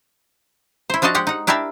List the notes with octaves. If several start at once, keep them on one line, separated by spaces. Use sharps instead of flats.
E4 C5
F3 D4 F#4 D#5 A5
G#3 G4 F#5
D#4 F#5
D4 E4 G4 A#4 D5 E5